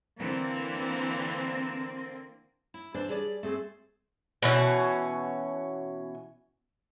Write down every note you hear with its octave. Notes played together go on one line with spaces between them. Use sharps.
D3 E3 A#3 C4
E4
E3 D4 C5 D5
G3 G#4 D5
A3 C4 G#4
B2 E3 C#4